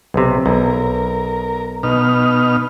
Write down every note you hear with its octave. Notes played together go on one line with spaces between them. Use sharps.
B1 C3
B1 A#4
B2 D#4 F6